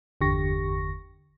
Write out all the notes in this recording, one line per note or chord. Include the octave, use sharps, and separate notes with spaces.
G1 E2 D3 G4 C#6 A#6